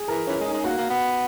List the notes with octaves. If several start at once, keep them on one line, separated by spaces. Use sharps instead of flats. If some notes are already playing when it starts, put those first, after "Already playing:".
Already playing: G#4
E3 A#4
E3 C#4
G#3
D#4
G#3
A#3 F#4
A#3
B3